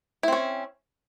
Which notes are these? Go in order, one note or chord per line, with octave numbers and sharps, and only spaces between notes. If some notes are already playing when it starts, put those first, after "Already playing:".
C4 C#4 E4